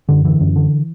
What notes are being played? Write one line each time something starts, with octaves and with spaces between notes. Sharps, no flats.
F#2 D3
D3 E3
F#2
D3